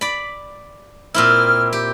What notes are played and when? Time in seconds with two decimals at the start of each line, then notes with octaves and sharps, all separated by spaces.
0.01 D5 B5
1.14 A#2 C4 E4 F6
1.73 G4